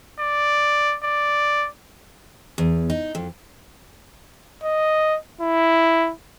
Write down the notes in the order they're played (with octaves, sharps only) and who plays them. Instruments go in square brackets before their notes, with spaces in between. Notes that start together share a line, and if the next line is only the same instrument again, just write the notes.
[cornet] D5
D5
[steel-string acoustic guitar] E2
D#4
F2
[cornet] D#5
E4